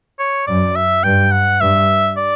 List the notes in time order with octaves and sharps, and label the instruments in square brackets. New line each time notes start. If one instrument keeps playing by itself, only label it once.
[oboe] C#5
[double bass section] F#2 [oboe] D5
[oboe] E5
[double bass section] G2 [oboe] G5
[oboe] F#5
[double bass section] G2 [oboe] E5
[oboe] D5